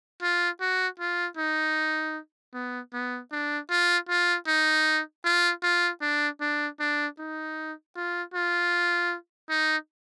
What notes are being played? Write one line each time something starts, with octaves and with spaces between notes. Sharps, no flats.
F4
F#4
F4
D#4
B3
B3
D4
F4
F4
D#4
F4
F4
D4
D4
D4
D#4
F4
F4
D#4